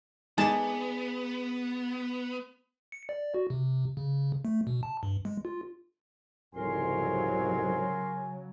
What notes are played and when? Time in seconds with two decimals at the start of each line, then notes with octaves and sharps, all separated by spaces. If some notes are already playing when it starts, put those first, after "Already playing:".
0.38 G#3 B3 D#4 G#4 D5 A5
2.92 C#7
3.09 D5
3.34 F#4
3.50 C3
3.97 C#3
4.45 A3
4.67 B2
4.83 A5
5.03 G2
5.25 G#3
5.45 F4
6.55 C2 F2 G#2 C#3 F#3 A#4 G#5 C6